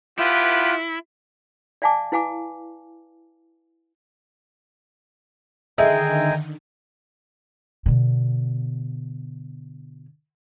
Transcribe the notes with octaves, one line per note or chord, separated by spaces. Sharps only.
B3 E4 F4 G4 B4
D5 E5 F5 G#5 A5 D6
E4 B4 F5 G#5 D6
D3 D#3 G#3 E5 G5 G#5 A#5
B2 D3